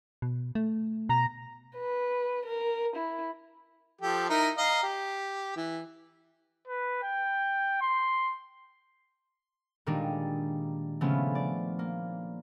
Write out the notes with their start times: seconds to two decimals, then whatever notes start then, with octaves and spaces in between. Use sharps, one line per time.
0.22 B2
0.55 A3
1.09 B2 A#5
1.77 B4
2.46 A#4
2.96 E4
4.01 F3 G4 A4
4.29 D#4 E4 A#4
4.58 D#5 F5 A#5
4.83 G4
5.57 E3
6.68 B4
7.03 G5
7.81 C6
9.86 A#2 D#3 G3 G#3 D4 D#4
11.01 C#3 F3 A3 B3 C#4 F4
11.35 D5
11.79 A#3